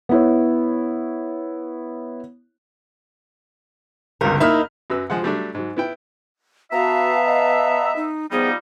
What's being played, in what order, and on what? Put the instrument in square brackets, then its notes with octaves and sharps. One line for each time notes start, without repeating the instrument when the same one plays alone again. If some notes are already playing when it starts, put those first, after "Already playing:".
[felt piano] B3 E4 C#5
[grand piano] G1 C#2 [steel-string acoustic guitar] A#4
[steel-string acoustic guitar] A#3 D#4 E4 [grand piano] E5 F6
[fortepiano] F#2 F#3 B4 E6
F3 G#3 F#5
F#3 G3 A3 D4
G#2 F#3
B3 E4 G5
[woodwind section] B3 E5 [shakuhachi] F#4 [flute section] F5 A5 [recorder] A#5
[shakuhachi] D#5
[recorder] D#4
[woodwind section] F3 G3 D#4 [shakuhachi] B3 [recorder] G#4